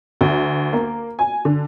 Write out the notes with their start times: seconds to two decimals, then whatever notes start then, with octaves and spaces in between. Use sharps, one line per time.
0.21 D2
0.73 A#3
1.19 G#5
1.45 D3